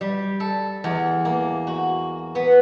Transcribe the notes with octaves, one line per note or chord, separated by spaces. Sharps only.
G3
A4
E2
A#3
F#4
B3